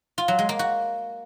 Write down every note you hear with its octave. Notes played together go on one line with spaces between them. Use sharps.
F4
F#3
G#3
A#3
F#4